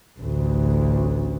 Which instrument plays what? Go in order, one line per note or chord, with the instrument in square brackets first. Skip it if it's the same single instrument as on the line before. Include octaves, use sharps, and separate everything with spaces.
[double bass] A1 D2